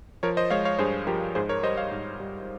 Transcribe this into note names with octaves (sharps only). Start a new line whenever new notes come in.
F3 A#4 C#5
C5 D#5
G#3 C#5 F5
C#5 F5
G2 G#4 C5
F3 G4 A#4
G#2 G#4 C5
A#4 C#5
G3 C5 D#5
C#5 F5
G#2
G3